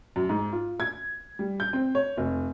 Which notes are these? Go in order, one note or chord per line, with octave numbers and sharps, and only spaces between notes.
F#2
G#2
F4
G#6
G3
G6
C4
C#5
F1